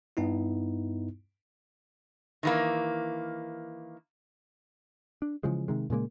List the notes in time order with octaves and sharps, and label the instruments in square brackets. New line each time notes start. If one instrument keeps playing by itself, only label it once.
[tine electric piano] G2 B3 D#4 E4
[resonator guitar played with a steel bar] D#3 E3 A#3
[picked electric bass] D4
C#3 E3 F3 G#3
C3 D#3 G#3
A#2 C#3 G#3 A#3